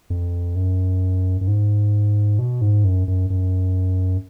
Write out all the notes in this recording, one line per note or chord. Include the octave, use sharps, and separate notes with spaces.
F2
F#2
F#2
G#2
B2
G#2
F#2
F#2
F#2